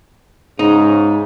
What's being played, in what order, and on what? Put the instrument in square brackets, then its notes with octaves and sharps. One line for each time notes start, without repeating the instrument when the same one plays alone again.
[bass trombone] G#2 [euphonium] C#3 [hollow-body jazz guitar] D#4